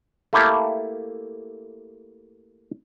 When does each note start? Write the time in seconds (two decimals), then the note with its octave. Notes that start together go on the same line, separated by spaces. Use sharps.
0.33 A3 A#3 E4 G4 A4 F5